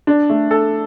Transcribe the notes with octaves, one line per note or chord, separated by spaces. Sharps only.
D4
A3
A4